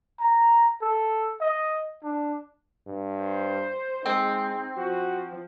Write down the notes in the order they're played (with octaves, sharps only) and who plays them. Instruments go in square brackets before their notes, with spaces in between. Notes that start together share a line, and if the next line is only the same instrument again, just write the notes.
[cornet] A#5
A4
D#5
D4
[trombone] G2
[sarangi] C5
[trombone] G#3 [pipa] C4 [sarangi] D#4
[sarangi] F3 [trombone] F#4